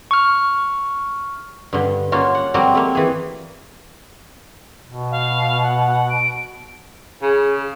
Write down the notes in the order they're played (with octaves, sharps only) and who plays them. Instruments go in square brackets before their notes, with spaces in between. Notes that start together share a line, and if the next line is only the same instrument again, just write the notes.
[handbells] C#6 F6
[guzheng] G2 D3
A#3 C#4 F4 F#4
F#5
F3 G3 A#3 C4 F#4
A3 A#3
E3 G#4
[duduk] B2
[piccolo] F5
F#5
D7
[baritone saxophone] C#3 [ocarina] G#4